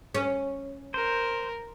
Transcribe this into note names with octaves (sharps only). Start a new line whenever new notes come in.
C#4
A#4 C5